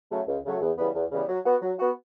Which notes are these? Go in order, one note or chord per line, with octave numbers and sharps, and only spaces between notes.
C#3 F#3 A3
C#2
C#3 F#3 A3
E2
C#3 E3 G3 B3
E2
C#3 E3 G3 B3
F#3
B3 F#4
F#3
B3 F#4